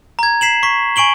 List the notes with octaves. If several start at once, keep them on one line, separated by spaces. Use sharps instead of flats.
A#5 G#6
B6 C7 E7 F#7
C#6 B6
G#5 C#6 D7 F#7 G7